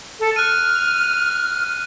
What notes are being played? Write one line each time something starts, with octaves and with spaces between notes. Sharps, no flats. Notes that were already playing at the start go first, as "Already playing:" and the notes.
A4
F6 F#6 D#7